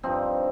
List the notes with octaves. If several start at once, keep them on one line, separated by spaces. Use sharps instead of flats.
G2 F3 C4 D#4